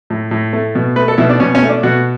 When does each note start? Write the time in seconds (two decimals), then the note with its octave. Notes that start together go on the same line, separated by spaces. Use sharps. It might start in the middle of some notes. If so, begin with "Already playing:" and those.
0.10 A2
0.31 A2
0.53 A3
0.75 B2
0.96 A3 B4
1.08 A4
1.18 B2 E4
1.29 D4
1.40 B2 C#4
1.55 C#4
1.62 A3
1.69 D4
1.83 B2 F#4